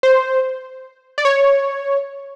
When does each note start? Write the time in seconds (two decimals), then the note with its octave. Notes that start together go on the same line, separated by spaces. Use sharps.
0.03 C5
1.18 D5
1.25 C#5